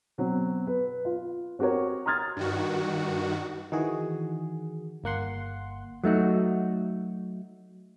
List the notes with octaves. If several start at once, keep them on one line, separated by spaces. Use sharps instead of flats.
B2 F#3 C4
B4
F4
C4 F#4 G4 A#4 C#5
A#5 C6 D#6 F6 G#6 A6
G2 D#3 F#4
D#3 E3 F#4 G#4
G1 A#3 F#5 C6
F#3 A3 D#4 F#4